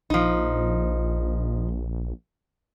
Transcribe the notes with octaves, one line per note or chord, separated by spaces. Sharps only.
A#1 F3 D#4